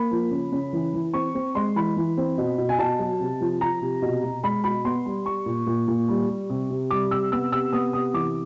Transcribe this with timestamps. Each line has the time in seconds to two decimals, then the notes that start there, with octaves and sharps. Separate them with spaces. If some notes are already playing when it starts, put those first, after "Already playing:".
Already playing: A#3 B5
0.11 F3
0.31 C#3
0.52 C#3
0.73 E3
0.94 E3
1.14 C4 C#6
1.35 C4
1.55 G#3 C6
1.76 E3 B5
1.97 E3
2.17 C4
2.38 B2
2.58 B2
2.69 G#5
2.79 B2 A5
2.99 F#3
3.20 C3
3.41 F3
3.61 F3 A#5
3.81 C3
4.02 B2
4.23 B2
4.43 G#3 B5
4.64 B2 B5
4.85 B3 C6
5.06 G3
5.26 G3 C#6
5.46 A#2
5.67 A#2
5.88 A#2
6.08 G3
6.29 G3
6.50 C3
6.70 C3
6.91 G3 D6
7.11 C3 E6
7.32 B3 E6
7.52 C3 E6
7.73 B3 D#6
7.93 C3 D#6
8.14 E3 D6